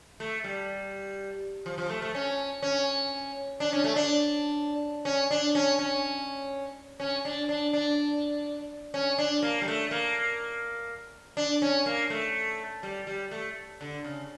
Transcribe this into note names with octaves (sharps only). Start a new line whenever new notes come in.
A3
G3
F3
F3
A3
A3
C#4
C#4
D4
C#4
A3
D4
C#4
D4
C#4
C#4
C#4
D4
D4
D4
C#4
D4
A#3
G3
A3
A#3
D4
C#4
A#3
A3
G3
G3
A3
D3
C#3